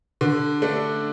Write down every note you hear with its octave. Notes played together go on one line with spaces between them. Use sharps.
D3
A3 D4